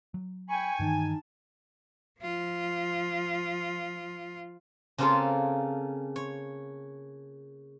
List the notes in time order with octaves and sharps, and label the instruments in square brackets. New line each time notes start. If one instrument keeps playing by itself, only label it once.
[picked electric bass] F#3
[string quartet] G5 B5 C#6 [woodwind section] G#5
[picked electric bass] G2 D#3 E3 [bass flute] D#4 [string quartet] A5
[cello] F3 F4
[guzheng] C#3 A#3 C4 F4 G#4 A4
C#5